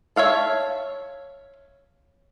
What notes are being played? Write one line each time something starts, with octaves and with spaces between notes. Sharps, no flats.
C#5 E5 F5 A5